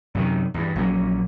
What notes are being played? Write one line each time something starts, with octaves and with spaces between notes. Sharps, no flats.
F#2 C3 D#3
E2 G2
A#1 F#3 A#3 C#4